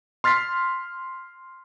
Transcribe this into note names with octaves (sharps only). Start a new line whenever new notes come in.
C6 F6 A6 B6 C7